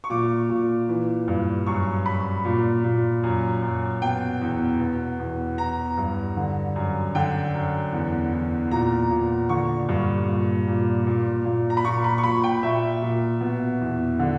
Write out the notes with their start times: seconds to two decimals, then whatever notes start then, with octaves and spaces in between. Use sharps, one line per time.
0.04 C#6
0.10 A#2 D6
0.50 A#2
0.89 E3
1.28 G2
1.66 F#2 C#6
2.06 F#2 B5
2.45 A#2
2.84 A#2
3.23 F#2
3.62 F#2
4.02 B2 G5
4.41 E2
4.80 B2
5.19 E2
5.58 E3 A#5
5.97 G2
6.37 D3
6.76 F#2
7.15 D3 G5
7.54 F#2
7.93 E2
8.32 E2
8.71 A#2 A#5
9.10 A#2
9.49 D3 C#6
9.89 G2
10.28 A#2
10.67 A#2
11.07 A#2
11.45 A#2
11.70 A#5
11.77 B5
11.85 A#2 C#6
12.04 B5
12.18 C#6
12.23 A#2 B5
12.44 G5
12.63 A#2 E5
13.02 A#2
13.41 B2
13.80 E2
14.19 D3